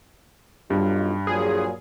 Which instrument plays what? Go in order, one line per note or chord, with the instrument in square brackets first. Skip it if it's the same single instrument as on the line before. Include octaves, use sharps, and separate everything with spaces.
[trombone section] B1 D#4 F4 [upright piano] G2
[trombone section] A#2 F3 F#3 [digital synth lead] G#4